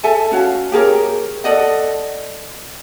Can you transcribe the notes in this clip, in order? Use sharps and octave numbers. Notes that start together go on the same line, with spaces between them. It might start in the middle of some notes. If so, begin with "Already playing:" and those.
A4 E5 G#5 A5
C#4 F#4 F5
G4 G#4 A#4 C#5
A4 D5 D#5 F#5